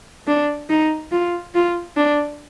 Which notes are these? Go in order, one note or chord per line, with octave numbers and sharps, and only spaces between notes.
D4
D#4
F4
F4
D4